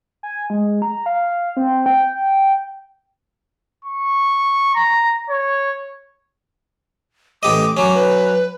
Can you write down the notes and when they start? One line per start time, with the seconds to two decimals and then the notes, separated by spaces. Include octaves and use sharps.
0.23 G#5
0.50 G#3
0.82 A#5
1.06 F5
1.57 C4
1.86 G5
3.85 C#6
4.75 A#5
5.30 C#5
7.43 A1 G4 D#5 D6
7.77 F#3 C#4
7.95 B4